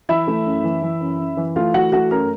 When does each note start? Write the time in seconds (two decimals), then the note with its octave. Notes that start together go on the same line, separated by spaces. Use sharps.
0.09 E3 E4 E5
0.27 A3
0.46 F#2
0.64 E3
0.82 E3
1.01 F#2
1.19 F#2
1.37 E3
1.56 A3 F4 F5
1.74 E3 F#4 F#5
1.92 A3 F#4 F#5
2.11 F#2 A#4 A#5